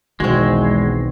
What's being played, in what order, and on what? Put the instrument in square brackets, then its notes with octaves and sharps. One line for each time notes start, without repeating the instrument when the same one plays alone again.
[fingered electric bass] B1 D#3 [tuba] E2 [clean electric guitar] G#3 [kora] C4 F#4